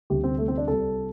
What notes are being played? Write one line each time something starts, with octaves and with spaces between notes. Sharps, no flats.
D2 C3 G3 G4
C4
A3
C4
D4
C2 C3 G3 A4